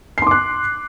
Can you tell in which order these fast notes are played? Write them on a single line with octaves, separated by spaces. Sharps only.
C7 C6 D6 F#6